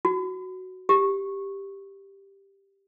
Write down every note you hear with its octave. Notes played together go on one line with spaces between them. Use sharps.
F#4
G4